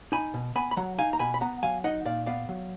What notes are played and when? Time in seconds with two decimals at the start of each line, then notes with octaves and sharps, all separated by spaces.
0.12 D#4 G#5 B5
0.34 B2
0.55 B3 G#5 B5
0.71 B5
0.77 F#3 F#5 A#5
0.98 D#4 F5 G#5
1.13 A#5
1.19 B2 G#5 B5
1.34 B5
1.41 B3 F#5 A#5
1.63 F#3 F5 G#5
1.84 D#4 D#5 F#5
2.06 A#2 D5 F5
2.26 B3 D5 F5
2.49 F#3